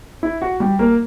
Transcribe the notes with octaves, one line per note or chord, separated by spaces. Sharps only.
E4
F#4
G3 G4
A#3 A#4